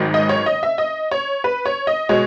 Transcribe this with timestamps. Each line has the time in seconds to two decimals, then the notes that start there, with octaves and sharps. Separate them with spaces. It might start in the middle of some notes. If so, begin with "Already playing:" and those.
Already playing: G#1 G#2 D#3 F#3
0.14 D#5
0.29 C#5
0.46 D#5
0.63 E5
0.78 D#5
1.11 C#5
1.44 B4
1.66 C#5
1.87 D#5
2.09 B2 G#3 C#5